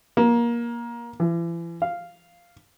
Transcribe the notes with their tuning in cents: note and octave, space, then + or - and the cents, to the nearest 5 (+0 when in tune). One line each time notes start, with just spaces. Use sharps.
A#3 +20
E3 +35
F5 -5